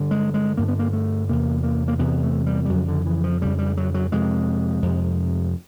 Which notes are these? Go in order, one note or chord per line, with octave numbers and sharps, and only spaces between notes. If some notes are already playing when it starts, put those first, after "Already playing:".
Already playing: G2 D3
G#3
G#3
G2 D3 A#3
B3
A#3
A3
E2 C3 A#3
A#3
A#3
E2 C3 B3
A3
G3
G3
F2 C#3 F#3
D3
E3
F3
F2 C#3 G3
G3
F#3
F#3
F2 C3 G#3
F2 C3